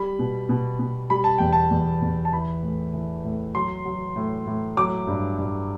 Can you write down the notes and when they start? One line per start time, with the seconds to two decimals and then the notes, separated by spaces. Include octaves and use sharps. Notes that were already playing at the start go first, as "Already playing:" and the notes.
Already playing: G3 B5
0.19 B2
0.49 B2
0.79 B2
1.10 G3 B5
1.24 A5
1.38 E2 G5
1.53 A5
1.71 E2
2.02 E2
2.25 A5
2.32 E3 B5
2.63 A2
2.93 E3
3.24 A2
3.54 F#3 C6
3.85 F#3
4.16 A2
4.46 A2
4.77 F#3 D6
5.07 G2
5.38 G2